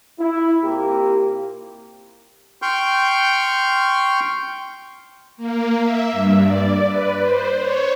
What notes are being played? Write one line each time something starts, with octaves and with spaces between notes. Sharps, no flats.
E4
A#2 A#3 C4 F4 G4
G5 C6 C#6 F6 G6
A#3
E5
G2
D5
B4
C5
C#5